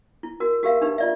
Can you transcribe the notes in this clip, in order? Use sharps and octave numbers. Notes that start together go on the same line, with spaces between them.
E4
F#4 A#4
F#4 G4 A#4 E5 F5
D4 D#4 G4 B4
F4 D5 E5